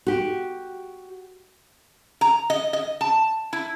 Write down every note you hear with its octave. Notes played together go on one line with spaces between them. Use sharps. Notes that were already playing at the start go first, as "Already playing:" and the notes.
F#4 G4
A#5
D#5
D#5
A5
E4